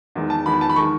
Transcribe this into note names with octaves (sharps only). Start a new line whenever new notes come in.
E2 D#3 G#3
A5
E2 D#3 G#3 B5
A5
B5
D#3 G#3 C#6